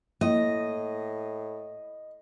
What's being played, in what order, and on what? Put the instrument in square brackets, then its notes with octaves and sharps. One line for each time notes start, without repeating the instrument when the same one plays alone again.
[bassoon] A2 [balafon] A#3 E4 [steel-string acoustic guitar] D#5